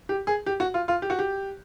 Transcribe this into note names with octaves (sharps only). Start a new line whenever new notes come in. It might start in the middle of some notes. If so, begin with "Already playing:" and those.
G4
G#4
G4
F#4
F4
F4
G4
F#4
G4